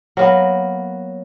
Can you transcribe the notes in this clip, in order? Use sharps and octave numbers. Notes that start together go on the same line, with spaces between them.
F#3 A#3 B3